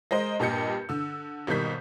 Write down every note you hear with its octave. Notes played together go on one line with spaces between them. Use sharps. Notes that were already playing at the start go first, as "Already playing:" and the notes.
G#3 A#4 C5 D#5
G2 A#2 G4 D#5 G6 C#7
D3 E6
G#1 B2 D#3 G3 G6 B6